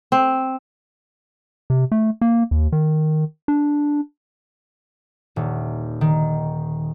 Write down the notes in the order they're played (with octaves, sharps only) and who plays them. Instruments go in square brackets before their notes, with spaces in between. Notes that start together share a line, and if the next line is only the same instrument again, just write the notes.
[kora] C4
[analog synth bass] C3
A3
A#3
D#2
D#3
D4
[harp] D#1
D#3